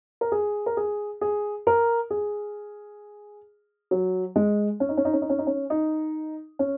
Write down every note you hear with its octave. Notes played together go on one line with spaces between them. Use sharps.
A#4
G#4
A#4
G#4
G#4
A#4
G#4
F#3
G#3
C#4
D#4
C#4
D#4
C#4
D#4
C#4
D#4
C#4
D#4
C#4